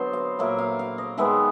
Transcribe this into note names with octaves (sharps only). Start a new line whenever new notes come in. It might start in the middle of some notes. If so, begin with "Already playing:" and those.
Already playing: D3 F#3 B3 C5 D#5
F5
A#2 F#3 A#3 E5
F5
F5
D#5
D#3 G#3 B3 E5